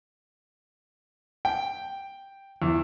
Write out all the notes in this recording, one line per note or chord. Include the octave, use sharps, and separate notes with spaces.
G5
E2